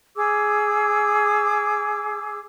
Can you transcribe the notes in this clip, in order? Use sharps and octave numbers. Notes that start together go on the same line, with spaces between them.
G#4 D6 E6